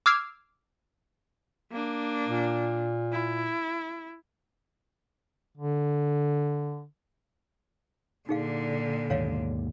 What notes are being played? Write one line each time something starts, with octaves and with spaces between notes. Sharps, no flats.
D6 E6 F6 G#6 C7
A#3 D4
A#2
E4
D3
A#2 D3 D#4 G#4 F5
D#2 G#2 B2 C#5 F5